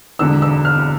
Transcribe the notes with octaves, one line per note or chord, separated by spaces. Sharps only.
E1 E2 D3 E6
E6
F6